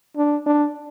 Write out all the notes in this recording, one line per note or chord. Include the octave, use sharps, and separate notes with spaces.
D4
D4